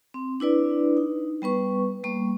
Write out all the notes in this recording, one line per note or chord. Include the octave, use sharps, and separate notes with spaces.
C4
D4 E4 B4 D5
D#4
G3 B3 B4 C#6
G3 A#3 C#6